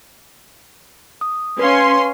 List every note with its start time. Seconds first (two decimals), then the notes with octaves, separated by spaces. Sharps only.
1.21 D#6
1.59 C#4 B4 F5 C6